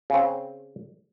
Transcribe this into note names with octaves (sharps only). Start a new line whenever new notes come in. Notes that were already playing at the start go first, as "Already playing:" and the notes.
C#3 C4